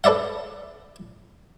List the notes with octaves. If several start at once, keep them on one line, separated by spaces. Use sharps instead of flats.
A4 B4 D5 E5 F#5